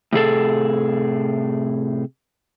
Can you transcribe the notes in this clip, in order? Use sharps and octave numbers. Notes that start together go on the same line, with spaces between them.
A2 C3 G#4 A4